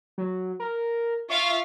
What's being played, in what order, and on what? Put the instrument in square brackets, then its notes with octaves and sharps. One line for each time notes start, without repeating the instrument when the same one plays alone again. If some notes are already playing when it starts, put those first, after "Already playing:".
[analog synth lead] F#3
A#4
[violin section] F4 E5 F5 [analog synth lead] C#6